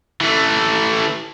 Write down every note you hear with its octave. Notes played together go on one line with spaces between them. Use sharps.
E3 A3